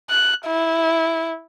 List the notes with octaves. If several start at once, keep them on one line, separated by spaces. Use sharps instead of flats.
F#6
E4